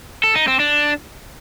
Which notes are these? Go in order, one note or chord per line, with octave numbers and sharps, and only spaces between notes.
A4
D#4
C4
D4